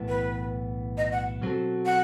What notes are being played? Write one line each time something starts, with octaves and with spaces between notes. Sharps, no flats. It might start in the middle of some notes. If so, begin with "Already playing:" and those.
Already playing: B1 A2 E3 B3
B4
D#5
F#5
B2 F#3 C4 F#4 A4
F#5